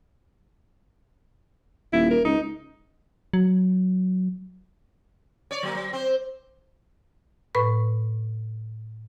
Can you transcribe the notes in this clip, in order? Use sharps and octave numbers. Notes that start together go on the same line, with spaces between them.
D#1 E4
A#4
C#2 D#4
F#3
C#5 D5
F#3 A#3
F#3
C4 C5
A2 B4 B5 C#6